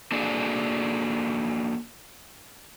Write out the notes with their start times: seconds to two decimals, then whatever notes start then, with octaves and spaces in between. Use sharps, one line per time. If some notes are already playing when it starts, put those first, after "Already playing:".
0.12 A#3 D4 F#4 G#4 A4 D5